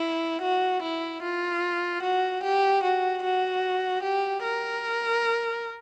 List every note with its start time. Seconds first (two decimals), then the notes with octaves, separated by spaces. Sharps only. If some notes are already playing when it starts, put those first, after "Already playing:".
Already playing: E4
0.42 F#4
0.83 E4
1.23 F4
2.02 F#4
2.43 G4
2.83 F#4
3.23 F#4
4.02 G4
4.43 A#4